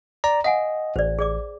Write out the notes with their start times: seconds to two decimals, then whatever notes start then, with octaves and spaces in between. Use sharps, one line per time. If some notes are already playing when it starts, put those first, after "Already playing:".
0.24 D5 A#5
0.44 D#5 F5 F#5 G#5
0.96 A1 C5 D5
1.19 G#4 D5 D6